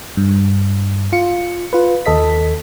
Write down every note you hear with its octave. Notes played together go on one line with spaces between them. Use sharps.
G2
F4 C#7
F4 B4
D#2 A4 D#5 B6